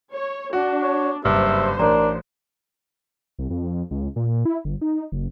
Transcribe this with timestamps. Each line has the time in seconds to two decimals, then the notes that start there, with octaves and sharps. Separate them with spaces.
0.12 C#5
0.53 D4 F#4
0.83 C#5
1.25 F#1 G2 C5 E5
1.79 A1 D4 A#4 D5 A#5
3.39 C2
3.50 F2
3.91 C#2
4.16 A#2
4.45 E4
4.65 G1
4.81 D#4
5.12 F#1